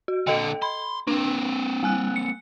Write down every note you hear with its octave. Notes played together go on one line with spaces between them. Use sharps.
F#4
A#2 D3 A4 D#5 G5
B5 C6
A#3 C4 D4
G3 G#5 F#6
C#7